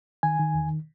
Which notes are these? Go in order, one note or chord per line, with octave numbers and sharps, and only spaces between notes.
D#3 G#5
D#3
E2